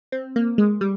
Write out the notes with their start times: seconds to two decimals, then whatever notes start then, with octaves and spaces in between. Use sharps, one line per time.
0.12 C4
0.36 A#3
0.58 G#3
0.81 G3